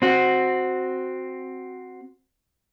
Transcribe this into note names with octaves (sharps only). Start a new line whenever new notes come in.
C4 F#4